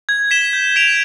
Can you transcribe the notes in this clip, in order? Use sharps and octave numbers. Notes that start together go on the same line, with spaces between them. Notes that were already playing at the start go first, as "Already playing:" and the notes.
G#6
B6 E7 G7
G6
B6 D7 F7